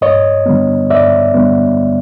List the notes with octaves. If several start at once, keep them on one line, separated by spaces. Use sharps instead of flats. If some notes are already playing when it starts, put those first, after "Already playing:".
G2 C#5 D#5
D3 G3 B3
G2 D5 E5
D3 G3 B3